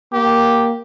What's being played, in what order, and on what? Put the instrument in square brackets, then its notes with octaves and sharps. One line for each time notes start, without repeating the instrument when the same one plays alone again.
[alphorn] A#3 [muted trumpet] G4